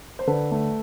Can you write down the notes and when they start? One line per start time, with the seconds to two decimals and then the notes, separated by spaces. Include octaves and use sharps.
0.19 C5
0.27 D3 A4 B4
0.51 A3